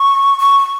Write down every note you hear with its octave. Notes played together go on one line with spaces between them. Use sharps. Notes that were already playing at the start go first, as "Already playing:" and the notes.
Already playing: C#6
C#6